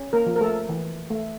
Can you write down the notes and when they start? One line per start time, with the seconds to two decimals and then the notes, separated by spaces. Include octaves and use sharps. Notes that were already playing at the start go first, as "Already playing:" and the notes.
Already playing: C#4
0.13 A#3 A#4
0.26 F3
0.36 A#4
0.41 A3 A4
0.69 E3
1.10 A3